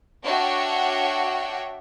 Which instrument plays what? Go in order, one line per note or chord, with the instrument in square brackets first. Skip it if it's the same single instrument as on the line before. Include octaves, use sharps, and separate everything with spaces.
[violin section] D4 F#4 C#5 E5 G5